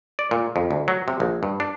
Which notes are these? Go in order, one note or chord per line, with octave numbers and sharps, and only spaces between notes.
D5
A#2
F2
D2
F#3
C3
A#1
G2
D4